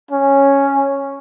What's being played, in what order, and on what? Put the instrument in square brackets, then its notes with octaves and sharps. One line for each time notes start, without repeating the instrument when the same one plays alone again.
[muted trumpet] C#4